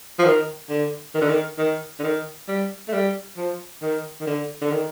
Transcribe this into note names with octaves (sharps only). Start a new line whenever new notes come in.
F3
D#3
D3
D#3
D3
D#3
D#3
D3
D#3
G3
A3
G3
F3
D#3
D#3
D3
D3
D#3